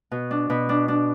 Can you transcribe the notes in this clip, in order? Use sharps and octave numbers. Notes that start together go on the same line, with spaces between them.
B2
D4
B2
D4
D4